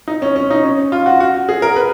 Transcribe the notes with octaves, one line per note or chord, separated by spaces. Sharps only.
D#4
C#4
C#4
D#4
C#4
F4
F#4
F#4
G#4
A#4
B4